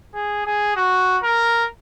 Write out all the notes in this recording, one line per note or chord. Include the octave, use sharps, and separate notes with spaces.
G#4
G#4
F#4
A#4